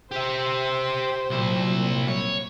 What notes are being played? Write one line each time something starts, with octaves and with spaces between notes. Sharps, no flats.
G4 C5 E5
C2 A#2 F#3 E4
C#5